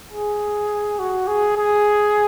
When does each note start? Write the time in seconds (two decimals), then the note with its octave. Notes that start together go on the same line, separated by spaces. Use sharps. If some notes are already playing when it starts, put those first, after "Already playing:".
0.12 G#4
0.99 F#4
1.27 G#4
1.57 G#4